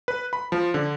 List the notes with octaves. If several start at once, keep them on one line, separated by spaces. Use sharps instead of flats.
B4
B5
F3
D3